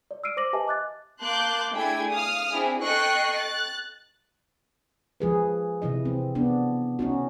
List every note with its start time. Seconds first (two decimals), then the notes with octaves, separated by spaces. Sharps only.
0.11 D5
0.24 E6 F6 C7 D7 D#7
0.37 C5 D6 A#6 F#7
0.53 G4 B4 D#5 E5 G#5 A5
0.66 D#5 D6 F#6 A6
1.22 A#3 A5 C6 D6 F#6 G6
1.72 A3 D4 E4 G#4 G5 G#6
2.13 F5 D#6 F6
2.51 C4 D4 E4 G#4
2.82 A4 D#5 G5 C#6 F#6 C7
3.33 F#6 A6
5.20 F3 G#4 B4
5.82 C3 E3 E4 D#5
6.05 C4
6.35 B3 D4
6.99 C#4 D#4 F#4